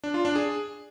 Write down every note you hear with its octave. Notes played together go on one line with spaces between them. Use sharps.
D4
F4
D4
G#4